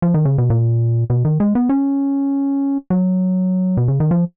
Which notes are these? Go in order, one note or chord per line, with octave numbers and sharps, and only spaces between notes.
F3
D#3
C#3
B2
A#2
B2
D#3
G#3
B3
C#4
F#3
B2
C#3
D#3
F3